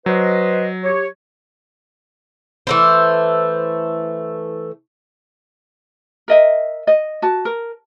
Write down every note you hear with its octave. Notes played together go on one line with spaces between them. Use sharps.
F#3 B4 C5 D#5
G4 C#5
E3 A3 C5
A#4 D#5 E5
D#5
F#4 A5
A#4